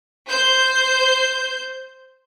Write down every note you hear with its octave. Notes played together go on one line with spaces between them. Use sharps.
C5 G6